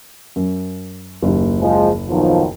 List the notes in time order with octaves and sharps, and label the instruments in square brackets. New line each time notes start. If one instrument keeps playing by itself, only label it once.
[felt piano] F#2
F#1 D#2
[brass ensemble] F3 G#3
B1 D#3 F3